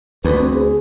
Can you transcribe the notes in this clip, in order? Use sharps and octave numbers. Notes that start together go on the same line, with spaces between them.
D2 B4
C4
G#4